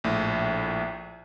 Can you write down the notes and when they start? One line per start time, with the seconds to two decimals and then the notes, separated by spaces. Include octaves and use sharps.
0.04 A#1 A2